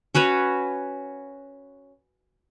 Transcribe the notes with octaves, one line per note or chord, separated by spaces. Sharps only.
C#4 F#4 B4 C#5